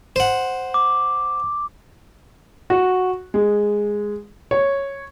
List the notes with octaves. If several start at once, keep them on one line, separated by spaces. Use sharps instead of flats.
C5 F#5
D6
F#4
G#3
C#5